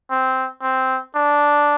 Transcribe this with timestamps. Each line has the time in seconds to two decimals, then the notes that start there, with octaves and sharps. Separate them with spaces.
0.10 C4
0.62 C4
1.15 D4